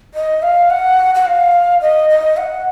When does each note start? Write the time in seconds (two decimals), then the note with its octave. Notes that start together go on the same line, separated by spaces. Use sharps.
0.14 D#5
0.42 F5
0.70 F#5
1.15 F#5
1.26 F5
1.81 D#5
2.10 D#5
2.37 F#5